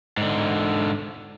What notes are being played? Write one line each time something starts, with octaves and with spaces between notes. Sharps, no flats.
G#2 D3